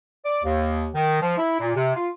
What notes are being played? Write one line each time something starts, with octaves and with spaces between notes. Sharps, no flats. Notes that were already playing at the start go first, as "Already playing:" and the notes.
D5
D#2
D#3
F3
E4
A#2
C3
F4